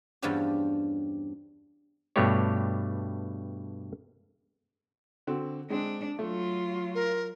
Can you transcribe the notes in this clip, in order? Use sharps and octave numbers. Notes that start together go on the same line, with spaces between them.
E2 G2 F3 C#4 D4 G4
G2 B2 A3 D4 G4 C#5
D3 C4 F#4
G#3 C4 D4
F#3 A3 F4
A#4